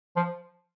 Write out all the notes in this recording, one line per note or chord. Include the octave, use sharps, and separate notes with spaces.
F3